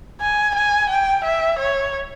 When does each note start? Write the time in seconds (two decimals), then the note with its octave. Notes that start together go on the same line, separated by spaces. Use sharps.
0.21 G#5
0.55 G#5
0.90 G5
1.24 E5
1.59 C#5